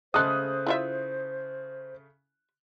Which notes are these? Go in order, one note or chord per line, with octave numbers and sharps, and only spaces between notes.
C#3 G#3 A3 A4 C5 D#6 F#6
E4 F4 E5